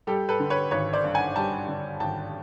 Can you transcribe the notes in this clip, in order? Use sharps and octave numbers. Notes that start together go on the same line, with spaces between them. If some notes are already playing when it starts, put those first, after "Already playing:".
G3 G4 A4
A4 B4
D3
B4 C#5
G#1 B4 C#5
C5 D5
G2
F#5 G#5
G3 G5 A5
D3
G#1 G5 A5